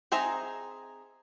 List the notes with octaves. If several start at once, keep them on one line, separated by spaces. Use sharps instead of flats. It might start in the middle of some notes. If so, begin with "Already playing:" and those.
C4 D#4 G#4 E5 A#5